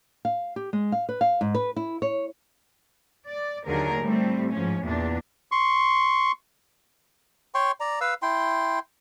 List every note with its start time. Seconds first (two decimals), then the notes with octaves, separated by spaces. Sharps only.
0.25 F5
0.56 G4
0.73 G#3
0.92 F5
1.09 B4
1.21 F5
1.41 G#2
1.55 B4
1.76 E4
2.02 C#5
3.26 D5
3.66 D#2 D3 F#3 G#4 A#4
4.01 A2 G3 A3 C4
4.52 G#2 F3 C#4
4.84 E2 A#2 D4
5.52 C6 C#6
7.54 C#5 G5 C6 C#6
7.80 D5 A#5
8.01 B4 F5 E6
8.22 E4 G5 C6